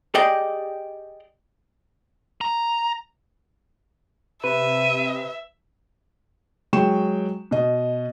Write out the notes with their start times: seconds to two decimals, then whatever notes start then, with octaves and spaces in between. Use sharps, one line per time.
0.15 G4 G#4 D5 D#5 G5
2.41 A#5
4.44 C3 B4 E5 D#7
6.73 F#3 G#3 G5 C#6 E7
7.51 B2 D#5